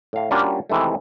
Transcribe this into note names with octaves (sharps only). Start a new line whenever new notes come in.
A2 F5
G3 A#3 C#4 D4 F4 F#4
C3 D#3 E3 G#3 A3